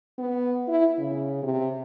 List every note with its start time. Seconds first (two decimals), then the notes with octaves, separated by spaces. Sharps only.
0.18 B3
0.68 E4
0.98 C#3
1.43 C3